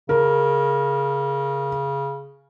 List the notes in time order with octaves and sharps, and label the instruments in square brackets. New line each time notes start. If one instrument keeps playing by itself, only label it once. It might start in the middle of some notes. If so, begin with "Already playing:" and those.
[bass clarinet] C#3 [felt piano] A#4